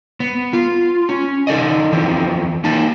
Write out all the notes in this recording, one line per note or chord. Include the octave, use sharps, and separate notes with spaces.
B3
F4
C#4
D#4 A4 D5 D#5
E3 F3 C4
A#3 D#4 A5